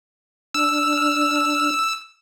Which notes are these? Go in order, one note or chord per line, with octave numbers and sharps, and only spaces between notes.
D4 E6 F6